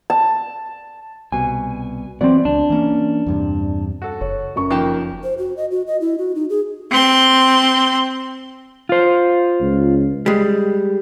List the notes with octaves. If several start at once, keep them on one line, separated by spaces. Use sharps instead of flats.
A5
C2 B2 G#5
E3 F#3 B3 C4 D5
C#2 D4
E3 A#3 C#4
E2 G2 C3
F#4 A4
F#1 C#5
F#2 C#6
F2 D#3 A#3 G4 A5
C5
F#4
D#5
F#4
D#5
E4
F#4
D#4
G#4
C4 C6
F4 C5
C#2
G3 G#3